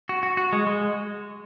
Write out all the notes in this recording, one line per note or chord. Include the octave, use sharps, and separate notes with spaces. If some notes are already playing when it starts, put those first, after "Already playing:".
F#4
F#4
F#4
G#3
G#3